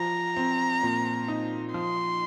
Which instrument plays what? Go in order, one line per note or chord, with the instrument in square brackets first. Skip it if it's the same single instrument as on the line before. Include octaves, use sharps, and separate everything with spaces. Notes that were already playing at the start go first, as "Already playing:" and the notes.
Already playing: [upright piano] F3 [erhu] A#5
[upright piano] C4
A#2
D#4
[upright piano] F3 [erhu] C6